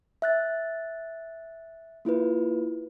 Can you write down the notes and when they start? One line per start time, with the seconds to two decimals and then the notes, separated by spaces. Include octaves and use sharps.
0.22 E5 F#6 A6
2.05 A#3 E4 F4 B4